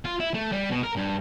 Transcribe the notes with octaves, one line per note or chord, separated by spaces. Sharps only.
F4
E4
A3
G3
B2
A#4
G2